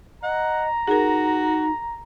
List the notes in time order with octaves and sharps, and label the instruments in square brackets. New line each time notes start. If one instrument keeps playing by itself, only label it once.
[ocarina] D#5 [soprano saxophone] F#5 [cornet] A#5
[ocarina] D#4 [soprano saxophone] F#4 [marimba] G#4 A#4